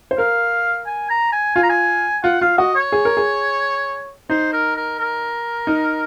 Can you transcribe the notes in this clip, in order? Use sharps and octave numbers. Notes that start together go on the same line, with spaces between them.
C5
A#4 F5
G#5
A#5
G#5
F4 G#5
A#5
G#5
F4 F#5
F4 F5
F#4 D#5
C#5
G#4
A#4
G#4
D#4 C5
A#4
A#4
A#4
D#4